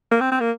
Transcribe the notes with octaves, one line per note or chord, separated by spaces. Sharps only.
A#3
C4
C4
A#3